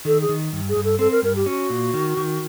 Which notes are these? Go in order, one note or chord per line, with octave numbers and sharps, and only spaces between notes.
D#3 A4
G#4
D#3
G2
G#4
G2
A4
C4 A4
A#4
G2 A#4
G4
C#4 F#4
A#2
D#3
D#3